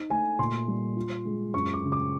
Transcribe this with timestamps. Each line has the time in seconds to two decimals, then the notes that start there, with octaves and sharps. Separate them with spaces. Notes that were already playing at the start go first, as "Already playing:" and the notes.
Already playing: D#4
0.10 A3 G#5
0.39 A#2 C6
0.68 G3
0.96 F4
1.25 G#3
1.54 F#2 C#6
1.73 D6
1.83 C#3
1.92 D6